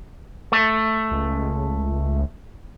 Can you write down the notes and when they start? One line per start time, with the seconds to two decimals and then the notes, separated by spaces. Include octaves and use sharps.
0.52 A3
1.11 C#2